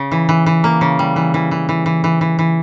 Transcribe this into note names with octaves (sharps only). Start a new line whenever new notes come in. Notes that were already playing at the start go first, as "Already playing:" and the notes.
Already playing: C#3
E3
E3
E3
A#3
C#3
G3
E3
E3
E3
E3
E3
E3
E3
E3